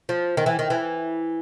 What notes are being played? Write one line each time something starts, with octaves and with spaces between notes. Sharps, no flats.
F3
D#3
E3
D#3
E3